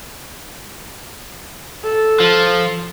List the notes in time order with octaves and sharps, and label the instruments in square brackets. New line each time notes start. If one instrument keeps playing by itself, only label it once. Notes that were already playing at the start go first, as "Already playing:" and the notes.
[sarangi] A4
[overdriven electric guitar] F3